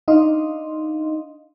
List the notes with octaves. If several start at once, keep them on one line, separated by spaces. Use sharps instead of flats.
D4 D#4 D#5 F5 C6